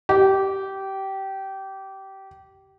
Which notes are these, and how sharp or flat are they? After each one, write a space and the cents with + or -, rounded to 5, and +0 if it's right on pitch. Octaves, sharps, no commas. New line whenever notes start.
G4 -20